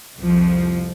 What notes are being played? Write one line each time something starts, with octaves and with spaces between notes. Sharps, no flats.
C2 F2 F3